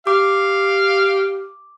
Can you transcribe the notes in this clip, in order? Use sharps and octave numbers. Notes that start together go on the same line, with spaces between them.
G4 F5 D6